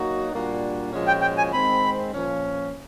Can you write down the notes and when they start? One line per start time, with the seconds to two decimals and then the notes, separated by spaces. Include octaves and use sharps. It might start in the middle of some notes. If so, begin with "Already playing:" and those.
Already playing: F#3 A#3 D#4 F#4
0.31 A#2 G3 A#3 D4 F#4
0.92 A#2 F3 G#3 C#4 F#4
1.07 G5
1.22 G5
1.38 G#5
1.53 D#3 G#3 C4 B5
2.13 A#2 F3 A#3 C#4